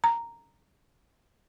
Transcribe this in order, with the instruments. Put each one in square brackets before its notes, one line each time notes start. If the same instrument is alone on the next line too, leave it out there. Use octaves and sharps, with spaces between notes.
[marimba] A#5